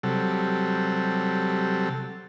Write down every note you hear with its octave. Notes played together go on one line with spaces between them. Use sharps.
C3 F#3 G3 A4